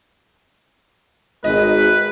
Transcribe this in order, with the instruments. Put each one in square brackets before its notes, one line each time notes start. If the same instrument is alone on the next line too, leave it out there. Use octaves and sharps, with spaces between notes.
[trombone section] G#1 [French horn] G#3 [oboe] B4 [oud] D#5